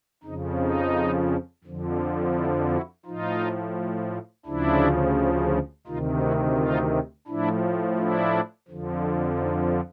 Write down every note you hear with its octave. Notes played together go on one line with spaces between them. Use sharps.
F2 C#3 F3 D#4
D#4
F2 D3 F3
D4 E4
E4 F#4
A2 F3 D#4 F4
D2 C#3 F3 D4 E4
D2 C3 D#3 D#4 F4
E4 F#4
D#4 F4
A2 F3 D4 E4
D4 E4
F2 D3 F3
D#4